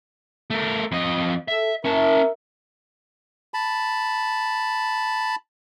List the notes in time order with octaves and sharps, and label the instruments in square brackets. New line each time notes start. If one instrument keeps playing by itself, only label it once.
[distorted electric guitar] A3 A#4
F2 D#5
[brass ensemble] A4 [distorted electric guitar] E5
[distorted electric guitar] C#4 A5 [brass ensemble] A#4 E5
[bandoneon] A5 B5